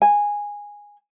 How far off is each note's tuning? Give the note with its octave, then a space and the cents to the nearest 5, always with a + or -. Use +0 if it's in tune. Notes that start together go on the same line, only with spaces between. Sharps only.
G#5 -10